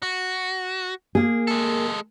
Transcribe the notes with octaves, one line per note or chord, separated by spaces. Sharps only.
F#4
A#3 G#4
G#3 A4